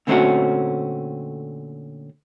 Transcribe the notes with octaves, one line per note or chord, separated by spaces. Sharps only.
A#2 D3 A3 C4 C#4 F#4